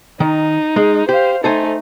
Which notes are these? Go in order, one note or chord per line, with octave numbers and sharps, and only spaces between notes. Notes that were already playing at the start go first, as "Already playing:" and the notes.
D#3 D#4
G#3
G4 C5 F5
A3 D#4 A4 C5 G#5